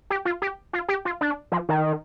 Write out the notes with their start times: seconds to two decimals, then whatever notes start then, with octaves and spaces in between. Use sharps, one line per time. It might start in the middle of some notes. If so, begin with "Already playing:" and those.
0.10 G4
0.25 F4
0.42 G4
0.73 F4
0.88 G4
1.05 F4
1.21 D4
1.52 F3
1.69 D#3